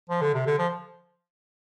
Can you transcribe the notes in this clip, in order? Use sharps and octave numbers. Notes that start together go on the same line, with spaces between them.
F3
D3
C3
D3
F3